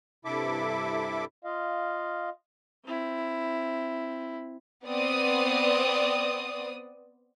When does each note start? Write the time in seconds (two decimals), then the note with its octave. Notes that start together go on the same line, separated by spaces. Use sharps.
0.25 G2 C3 E4 A4 E5 D6
1.44 F4 D#5 F5
2.85 C4 E4
4.84 B3 C4 D5 D#6